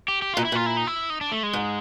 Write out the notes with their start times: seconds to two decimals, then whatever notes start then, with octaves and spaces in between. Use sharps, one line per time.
0.08 G4
0.22 G4
0.34 F4
0.37 A#2 D#4
0.45 E4
0.52 A#2 F4
0.66 E4
0.77 D#4
0.87 E4
1.10 D#4
1.21 D4
1.32 A3
1.43 G#3
1.53 G#2